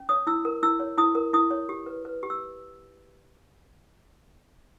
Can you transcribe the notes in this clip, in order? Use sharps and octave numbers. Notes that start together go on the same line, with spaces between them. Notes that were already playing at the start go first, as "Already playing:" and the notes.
Already playing: C#4
C#5 D#6
E4 E6
A#4
E4 E6
C#5
E4 D#6
A#4
E4 D#6
C#5
G4
B4
B4
G4
E6